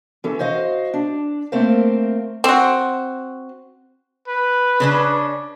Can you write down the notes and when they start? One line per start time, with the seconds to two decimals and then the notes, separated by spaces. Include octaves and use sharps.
0.24 E3 C#4 A4
0.39 F#4 C5 D#5 F5
0.94 D4
1.52 A3 A#3 C4 A#4 C5 F5
2.44 C4 F#4
4.28 B4
4.80 C#3 C#4 D4